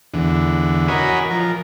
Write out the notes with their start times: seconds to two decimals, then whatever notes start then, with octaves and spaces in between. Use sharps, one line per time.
0.14 E2 D3
0.88 F#4 A#4 C#5 D#5 G#5 B5
1.31 F3 A#4